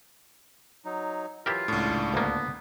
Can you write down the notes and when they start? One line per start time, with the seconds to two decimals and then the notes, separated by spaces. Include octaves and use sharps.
0.85 F#3 D#4
1.46 E3 F#3 E4 F4 G4 A#4
1.68 C#2 A2 D4
2.14 D2 A#3 B3